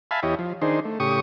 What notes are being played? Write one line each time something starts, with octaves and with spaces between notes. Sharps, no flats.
E5 F5 G#5 A5 B5
E2 E4 G4 C#5 D#5
F3
D#3 D4 D#4 G#4 C5
A3
A2 C#3 G4 C#6 D#6